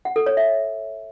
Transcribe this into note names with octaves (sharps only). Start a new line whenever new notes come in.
F#5
A4
C#5
E5